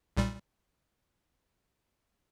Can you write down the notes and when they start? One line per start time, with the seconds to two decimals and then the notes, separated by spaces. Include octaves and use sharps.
0.17 B1 A#2 G3